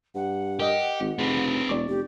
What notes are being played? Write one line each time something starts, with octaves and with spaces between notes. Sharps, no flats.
G2 F#5
G4 A#4 D#5
G#1
F1 C4 G#4 B4
E1 D5 C#6 D6
F1 G4